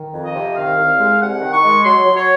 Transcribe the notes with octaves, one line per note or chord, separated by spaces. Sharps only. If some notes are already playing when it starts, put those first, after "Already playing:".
Already playing: D#3
F2
D#5
C3
D#3 F5
C2
G#3
C2 F#5
D#3
C#6
G#3
F#3 C6
F#3
C#5